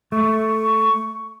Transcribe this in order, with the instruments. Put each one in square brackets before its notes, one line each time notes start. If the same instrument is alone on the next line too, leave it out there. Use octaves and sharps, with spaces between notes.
[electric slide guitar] A3 [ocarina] C#6